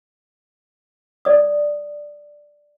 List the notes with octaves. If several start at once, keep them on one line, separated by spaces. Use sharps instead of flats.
D5 D#6